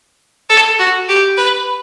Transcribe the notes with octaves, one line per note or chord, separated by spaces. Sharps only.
A4
F#4
G4
B4